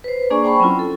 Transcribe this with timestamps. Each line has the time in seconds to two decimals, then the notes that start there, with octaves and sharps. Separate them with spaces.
0.04 B4 C5
0.30 A#3 D4 G#4 D5 G#5 C#6
0.44 C5 G5 A5 B5 C#6
0.59 F#3 C4 C#4 E4 F4
0.79 A4